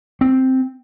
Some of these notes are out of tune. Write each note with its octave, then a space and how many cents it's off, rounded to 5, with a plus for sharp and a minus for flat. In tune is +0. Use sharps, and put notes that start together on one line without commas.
C4 +0